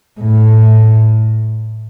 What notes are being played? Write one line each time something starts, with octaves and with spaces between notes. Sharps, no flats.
A2